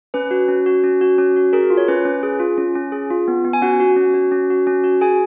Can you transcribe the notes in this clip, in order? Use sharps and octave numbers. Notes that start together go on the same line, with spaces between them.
C#4 B4
F#4
C#4
F#4
C#4
F#4
C#4
F#4
G#4 A#4
F4
C#5
C#4 B4
C#4
G#4
F4
C#4
C#4
G#4
F4
B3
B3
G#5
C#4 F#4 F#5
F#4
C#4
F#4
C#4
F#4
C#4
F#4
G#4 G#5